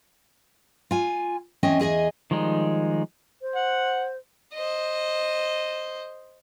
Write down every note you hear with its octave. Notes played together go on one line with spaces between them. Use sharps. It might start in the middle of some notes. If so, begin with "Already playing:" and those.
F4 G#5
E2 C4 C#4 D#5 G#5
E2 G#4 D#5 G#5
D#3 F3 G3 G#3 D#4
C5
F#5
C5 D#5